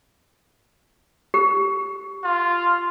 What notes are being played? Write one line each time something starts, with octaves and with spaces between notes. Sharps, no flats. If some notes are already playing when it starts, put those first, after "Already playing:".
G4
F4